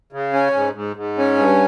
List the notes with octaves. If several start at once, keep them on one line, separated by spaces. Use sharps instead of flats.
C#3
C#4
G#2
G#2
G#2
C#4
G2